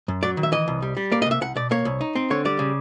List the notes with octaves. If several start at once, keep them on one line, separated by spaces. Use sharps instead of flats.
F#2
F#3 D5
D#3
E5
E3 D#5
C2
G3
G3
A#3 D5
D#5
C3 E5
C2 F#5
B2 D5
A#3 C#5
C2
D#4
C4
D3 C#5
G3 D5
C#3